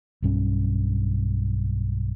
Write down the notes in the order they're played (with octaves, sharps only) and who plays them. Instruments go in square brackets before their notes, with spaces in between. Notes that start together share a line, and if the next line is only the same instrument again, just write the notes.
[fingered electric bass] B1 G2 C#4